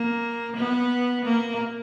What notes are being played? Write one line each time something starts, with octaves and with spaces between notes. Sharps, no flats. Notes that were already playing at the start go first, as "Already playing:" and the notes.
Already playing: A#3
B3
A#3